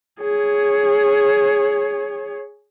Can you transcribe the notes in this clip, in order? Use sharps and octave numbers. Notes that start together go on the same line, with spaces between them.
G#4 C#5